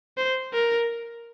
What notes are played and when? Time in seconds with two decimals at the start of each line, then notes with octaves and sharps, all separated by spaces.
0.18 C5
0.53 A#4